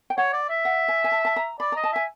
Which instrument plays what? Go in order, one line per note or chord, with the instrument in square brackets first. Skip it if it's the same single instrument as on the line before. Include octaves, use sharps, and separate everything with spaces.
[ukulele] G5
[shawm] C#5 [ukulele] F#5
[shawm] D5
E5
[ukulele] F#5
G#5
G#5
A5
A5
A#5
[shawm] D5 [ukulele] B5
[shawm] D#5 [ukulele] A#5
[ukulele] A5
[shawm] E5 [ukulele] G#5